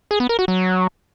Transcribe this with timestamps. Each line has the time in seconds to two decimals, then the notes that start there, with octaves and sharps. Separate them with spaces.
0.11 G#4
0.20 B3
0.29 A#4
0.39 F#4
0.48 F#3